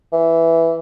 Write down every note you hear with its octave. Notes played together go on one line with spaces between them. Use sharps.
E3